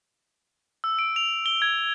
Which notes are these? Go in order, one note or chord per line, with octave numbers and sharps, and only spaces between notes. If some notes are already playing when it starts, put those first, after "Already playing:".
E6
D7
F7
G7
G#6